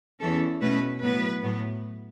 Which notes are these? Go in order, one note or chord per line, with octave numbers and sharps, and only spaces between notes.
E2 E3 C#4 A4
B2 A3 C#4 B4
A2 F#3 B3 B4
A2 F#3 B3